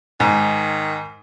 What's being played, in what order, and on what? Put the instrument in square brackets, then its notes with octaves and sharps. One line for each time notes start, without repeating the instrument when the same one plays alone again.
[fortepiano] G#2 [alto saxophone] D#3